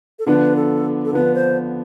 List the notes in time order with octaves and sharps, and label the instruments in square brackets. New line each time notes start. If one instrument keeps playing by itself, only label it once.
[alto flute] A4
[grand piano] D3 F3 B3 D4 [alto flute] B4
[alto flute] A4
A4
[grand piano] D3 F3 B3 D4 [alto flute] B4
[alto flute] C5